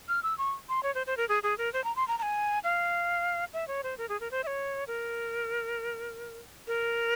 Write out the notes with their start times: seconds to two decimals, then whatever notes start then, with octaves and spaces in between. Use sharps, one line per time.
0.09 F6
0.23 E6
0.38 C#6
0.69 C6
0.83 C#5
0.95 C5
1.07 C5
1.17 A#4
1.29 G#4
1.43 G#4
1.58 A#4
1.73 C5
1.84 A#5
1.96 C6
2.08 A#5
2.18 A#5
2.22 G#5
2.64 F5
3.53 E5
3.68 C#5
3.83 C5
3.98 A#4
4.09 G#4
4.20 A#4
4.31 C5
4.44 E5
4.47 C#5
4.87 A#4
6.67 A#4